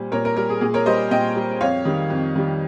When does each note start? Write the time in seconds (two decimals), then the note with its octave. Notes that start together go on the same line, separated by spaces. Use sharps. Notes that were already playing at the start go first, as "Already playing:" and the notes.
Already playing: A#2 G3 C5
0.12 A#2 A#4 C#5
0.25 A#4
0.37 G3 A#4
0.50 G#4
0.61 A#2 G#4
0.74 A#4 C#5
0.86 G3 C5 D#5
1.11 A#2 D#5 G5
1.36 G3
1.61 F2 C#5 F5
1.85 D#3 G3
2.10 F2
2.35 D#3 G3